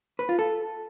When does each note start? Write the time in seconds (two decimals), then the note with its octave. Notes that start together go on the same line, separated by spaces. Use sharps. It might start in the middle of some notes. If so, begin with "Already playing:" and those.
0.19 B4
0.29 F4
0.39 A4